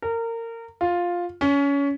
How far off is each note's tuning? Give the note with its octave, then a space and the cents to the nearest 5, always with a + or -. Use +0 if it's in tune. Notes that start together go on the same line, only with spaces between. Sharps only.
A#4 -25
F4 +5
C#4 +25